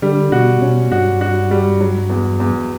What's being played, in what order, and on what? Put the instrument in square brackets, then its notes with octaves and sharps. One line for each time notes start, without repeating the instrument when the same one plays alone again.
[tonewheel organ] D3 [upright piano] G3
[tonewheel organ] B2 [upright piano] F#4
[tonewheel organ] B2 [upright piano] C#4
[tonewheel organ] G2 [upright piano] F#4
[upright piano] F#4
G3
F#3
E2
E2